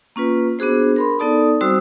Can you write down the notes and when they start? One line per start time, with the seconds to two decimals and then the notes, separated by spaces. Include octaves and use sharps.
0.16 A#3 C#4 F4 B4
0.59 B3 D4 F#4 G#4 C5
0.96 A#4 B5 C6
1.19 B3 D#4 A4 D5 A5 D#6
1.61 G3 C4 F#4 C5 D#6 E6